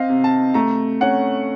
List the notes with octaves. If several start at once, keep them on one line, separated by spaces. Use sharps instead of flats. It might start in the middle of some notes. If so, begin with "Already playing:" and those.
Already playing: C4 D#5 F5
C3
A5
A3 A#5
C#4 F#5